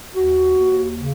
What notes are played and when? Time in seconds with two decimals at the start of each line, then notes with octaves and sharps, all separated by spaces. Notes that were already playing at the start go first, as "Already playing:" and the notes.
0.15 D#2 F#4
0.57 D#2
0.98 C#3